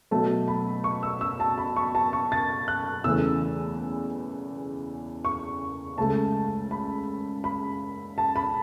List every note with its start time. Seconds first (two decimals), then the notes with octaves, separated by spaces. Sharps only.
0.11 B2 F#3 A3 A5
0.48 B5
0.84 C#6
1.03 E6
1.21 E6
1.40 A5
1.58 B5
1.76 C#6
1.95 A5
2.13 C#6
2.32 A6
2.68 F#6
3.04 E2 C#3 E3 A3 E6
5.25 C#6
5.98 C#2 C#3 A3 A5
6.71 B5
7.44 B5
8.18 A5
8.36 B5